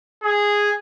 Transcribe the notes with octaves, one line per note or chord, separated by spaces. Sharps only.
G#4